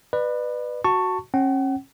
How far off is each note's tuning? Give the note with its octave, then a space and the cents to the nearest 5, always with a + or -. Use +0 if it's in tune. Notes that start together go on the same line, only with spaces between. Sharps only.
B4 +0 D5 +40
F#4 +0 A5 +20 C#6 +0
C#4 -35 F#5 +40